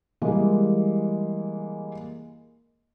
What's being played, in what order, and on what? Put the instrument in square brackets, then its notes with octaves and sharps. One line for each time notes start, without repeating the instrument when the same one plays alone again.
[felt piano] E3 G3 G#3 A#3